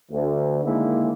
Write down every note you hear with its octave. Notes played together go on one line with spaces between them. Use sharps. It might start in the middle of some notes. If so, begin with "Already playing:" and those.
D2
D3 D#3 G#3 A#3 E4